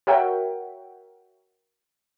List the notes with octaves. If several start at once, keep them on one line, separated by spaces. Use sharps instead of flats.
F#4 A#4 C#5 E5 F#5 G5